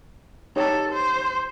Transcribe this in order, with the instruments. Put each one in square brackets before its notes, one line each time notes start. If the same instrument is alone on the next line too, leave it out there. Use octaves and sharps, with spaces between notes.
[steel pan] D#4 G4 C#5 [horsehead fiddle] A4
[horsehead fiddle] C5